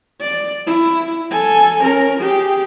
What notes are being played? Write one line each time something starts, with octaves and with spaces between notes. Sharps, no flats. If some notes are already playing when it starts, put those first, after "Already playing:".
D5
E4
A4 G#5
C#4 A#4
G4 G#4